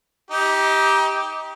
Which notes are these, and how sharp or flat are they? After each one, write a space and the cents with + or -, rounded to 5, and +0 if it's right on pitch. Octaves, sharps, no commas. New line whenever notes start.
D#4 +30 G4 +0